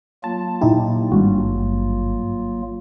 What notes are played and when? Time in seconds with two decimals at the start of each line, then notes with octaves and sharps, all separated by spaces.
0.24 F#3 A#3 F4 A5
0.61 A#2 D#4 E4 G4
1.12 G#1 G2 F#4